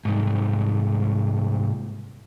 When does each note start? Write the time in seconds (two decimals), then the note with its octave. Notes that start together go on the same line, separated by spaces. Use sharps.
0.05 C2 G#2